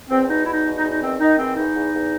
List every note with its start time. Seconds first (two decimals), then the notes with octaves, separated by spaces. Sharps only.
0.09 E2 C4
0.27 B2 D#4
0.46 E2 E4
0.52 D#4
0.64 B2
0.77 D#4
0.82 E2
0.89 D#4
1.01 D#3 C4
1.19 D#3 D#4
1.37 E2 C4
1.56 E2 D#4
1.74 E2
1.93 E2